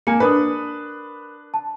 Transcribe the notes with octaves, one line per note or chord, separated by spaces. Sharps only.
A#3 G#5 C#7
D4 A#4 B4 D#6
A5